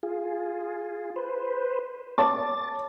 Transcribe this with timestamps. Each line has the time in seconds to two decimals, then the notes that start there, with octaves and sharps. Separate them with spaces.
0.03 F4 G#4
1.16 B4 C5
2.18 C#5 A5 D6 A6